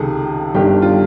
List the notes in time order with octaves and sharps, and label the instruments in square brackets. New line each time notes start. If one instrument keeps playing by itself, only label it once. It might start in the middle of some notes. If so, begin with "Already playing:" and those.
Already playing: [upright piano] C#2 C3 D#3 G#4 A4
G1 G2 D#3 G4
F4